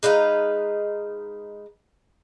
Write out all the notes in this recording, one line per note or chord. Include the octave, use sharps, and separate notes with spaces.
G#3 D#4 B4 F5